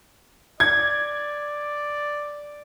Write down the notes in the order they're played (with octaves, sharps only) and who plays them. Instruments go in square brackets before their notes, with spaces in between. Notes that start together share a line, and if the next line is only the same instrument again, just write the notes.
[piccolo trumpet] D5 [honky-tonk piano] G#6